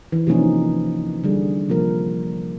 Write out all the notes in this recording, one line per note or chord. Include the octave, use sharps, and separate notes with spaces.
E3
C3 F3 A#3 C#4 D#4
D3 G3 G#4
C3 F3 A#3 A#4